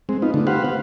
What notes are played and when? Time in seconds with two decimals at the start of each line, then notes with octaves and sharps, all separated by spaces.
0.09 G#3 C4
0.22 B3 D#4 F4
0.34 D3 A3
0.47 G4 B4 C5 F5 F#5
0.65 B3 F5